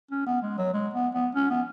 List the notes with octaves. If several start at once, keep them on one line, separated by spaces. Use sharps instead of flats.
C#4
B3
G#3
F#3
G#3
B3
B3
C#4
B3